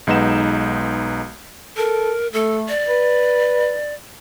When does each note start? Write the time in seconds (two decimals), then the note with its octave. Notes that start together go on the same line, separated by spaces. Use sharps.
0.07 B1 G#3 D#4 B4 F#5 E7
1.77 A4 A#4
2.33 A3 A4
2.69 D5
2.88 B4